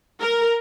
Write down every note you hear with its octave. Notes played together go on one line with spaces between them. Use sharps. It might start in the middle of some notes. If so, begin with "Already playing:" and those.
A#4